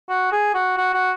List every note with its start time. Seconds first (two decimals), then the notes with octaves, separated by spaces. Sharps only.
0.09 F#4
0.32 G#4
0.54 F#4
0.78 F#4
0.94 F#4